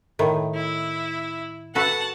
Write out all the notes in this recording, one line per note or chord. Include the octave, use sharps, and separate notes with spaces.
A2 D#3
E4
F#4 A4 B4 F#5 A5